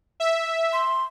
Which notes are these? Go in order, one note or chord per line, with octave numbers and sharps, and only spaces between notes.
E5
C6